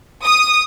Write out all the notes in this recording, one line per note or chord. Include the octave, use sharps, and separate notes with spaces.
D#6